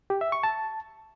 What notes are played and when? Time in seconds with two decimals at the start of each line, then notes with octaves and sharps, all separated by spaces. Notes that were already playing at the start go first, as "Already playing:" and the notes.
0.10 G4
0.21 E5
0.32 C#6
0.43 A5